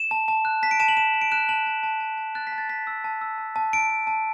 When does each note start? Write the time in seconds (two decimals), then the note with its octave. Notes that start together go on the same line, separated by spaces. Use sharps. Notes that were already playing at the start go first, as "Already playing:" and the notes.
Already playing: E7
0.11 A5
0.28 A5
0.45 F#6
0.63 A5 B6
0.71 D7
0.80 A5 E7
0.88 F#7
0.97 A5 E7
1.14 A5
1.22 D7
1.32 F#6 E7
1.49 A5 F#7
1.66 A5
1.83 A5
2.00 A5
2.18 A5
2.35 F#6 A6
2.47 B6
2.52 A5
2.58 A6
2.69 A5 B6
2.87 E6
3.04 A5
3.21 E6
3.38 A5
3.56 A5
3.73 A5 D7
3.90 A5
4.07 A5